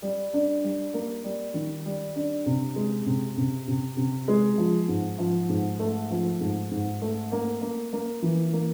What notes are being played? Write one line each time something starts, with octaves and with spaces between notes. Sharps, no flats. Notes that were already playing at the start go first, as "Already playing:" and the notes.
G3
D4
G3
A#3
G3
D#3
G3
D4
C3
G#3
C3
C3
C3
C3
G#3
F3
G#2
F3
G#2
A3
F3
G#2
G#2
A3
A#3
A#3
A#3
E3
A#3